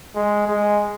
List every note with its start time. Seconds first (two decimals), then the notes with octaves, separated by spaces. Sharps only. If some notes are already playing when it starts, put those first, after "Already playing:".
0.15 G#3
0.48 G#3